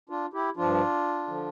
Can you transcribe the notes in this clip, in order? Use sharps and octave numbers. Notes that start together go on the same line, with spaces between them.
D4 F4
E4 G4
G2 F3 D4 F4
D3 F3